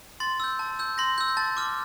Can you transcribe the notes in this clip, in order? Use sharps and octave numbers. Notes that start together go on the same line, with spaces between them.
C6 A6
E6 G6
A5
E6 G6
C6 A#6
G6
E6
G6
A5 A6
D6 F6